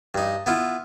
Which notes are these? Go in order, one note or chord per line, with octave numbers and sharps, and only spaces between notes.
G2 D#4
B3 E4 F4